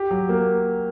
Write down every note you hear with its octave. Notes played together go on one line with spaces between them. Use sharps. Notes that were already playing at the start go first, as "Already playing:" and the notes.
Already playing: G4
F#3
A#3